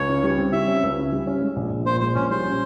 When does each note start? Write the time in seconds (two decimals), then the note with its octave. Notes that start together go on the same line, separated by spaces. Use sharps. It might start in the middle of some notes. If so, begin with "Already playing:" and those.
Already playing: C#2 C#5
0.09 C#3
0.24 G3
0.38 C4
0.52 G3 E5
0.68 C#4
0.83 C#2
0.98 C#3
1.12 G3
1.27 C#4
1.42 G#3
1.56 A#1
1.71 A#1
1.86 A#2 C5
2.01 G#3 C5
2.15 A#1 C#4
2.30 G3 C5
2.45 C#4